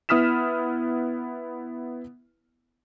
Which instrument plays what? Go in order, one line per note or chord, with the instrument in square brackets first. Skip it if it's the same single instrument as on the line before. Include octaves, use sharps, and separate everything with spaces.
[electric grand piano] B3 E4 D#6 F6 B6 E7